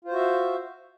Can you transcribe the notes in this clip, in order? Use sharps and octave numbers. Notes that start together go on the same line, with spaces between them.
F4 F#4 C5 E5 F5